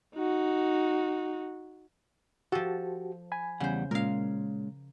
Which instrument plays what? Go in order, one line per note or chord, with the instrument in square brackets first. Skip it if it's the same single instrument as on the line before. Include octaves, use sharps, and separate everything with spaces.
[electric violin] D#4 F#4
[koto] F3 A4 [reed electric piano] F#4 G4
[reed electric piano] G#5 B5
[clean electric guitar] E2 G3 F#5 [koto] C#3 C5
[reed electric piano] A#2 [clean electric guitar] G#3 C#4 [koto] A#4 F5